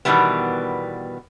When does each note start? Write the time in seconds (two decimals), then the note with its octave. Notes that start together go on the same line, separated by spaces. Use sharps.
0.05 B2 D#3 E3 G3 B3